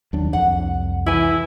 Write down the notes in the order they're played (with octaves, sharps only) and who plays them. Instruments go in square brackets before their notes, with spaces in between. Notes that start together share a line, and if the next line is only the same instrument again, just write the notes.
[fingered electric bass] D#2 F#3 D4
[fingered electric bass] C2 F2 [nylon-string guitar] F#5
[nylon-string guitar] E3 G#5 [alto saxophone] E4